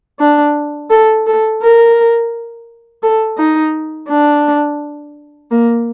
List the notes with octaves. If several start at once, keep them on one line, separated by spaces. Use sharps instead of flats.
D4
A4
A4
A#4
A4
D#4
D4
A#3